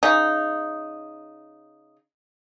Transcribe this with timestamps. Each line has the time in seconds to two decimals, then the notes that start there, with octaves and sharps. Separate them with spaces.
0.03 C#3 D#4